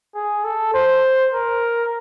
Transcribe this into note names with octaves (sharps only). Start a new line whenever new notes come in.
G#4
A4
C5
A#4